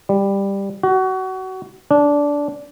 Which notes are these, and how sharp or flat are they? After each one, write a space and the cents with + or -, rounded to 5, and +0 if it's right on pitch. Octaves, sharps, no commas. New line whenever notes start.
G3 +10
F#4 +25
D4 -15